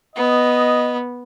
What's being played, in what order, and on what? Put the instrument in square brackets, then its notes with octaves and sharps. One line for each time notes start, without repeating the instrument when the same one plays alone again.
[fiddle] B3 [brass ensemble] D#5